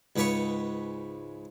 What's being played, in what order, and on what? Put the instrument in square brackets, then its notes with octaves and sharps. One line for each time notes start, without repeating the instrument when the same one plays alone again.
[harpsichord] C#2 G#2 B4 C#5 C#6